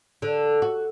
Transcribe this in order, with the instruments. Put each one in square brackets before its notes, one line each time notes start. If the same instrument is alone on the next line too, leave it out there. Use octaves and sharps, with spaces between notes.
[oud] D3
F#4